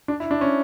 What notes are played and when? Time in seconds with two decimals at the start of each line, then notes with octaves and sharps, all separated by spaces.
0.08 D4
0.20 E4
0.31 D4
0.41 C#4